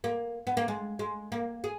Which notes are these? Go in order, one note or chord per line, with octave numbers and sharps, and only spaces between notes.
A#3
B3
A#3
G#3
G#3
A#3
G#4